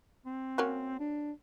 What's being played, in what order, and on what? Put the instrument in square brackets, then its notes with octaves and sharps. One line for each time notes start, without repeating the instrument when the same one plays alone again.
[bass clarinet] C4
[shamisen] A#3 C#4 F#4
[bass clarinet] D4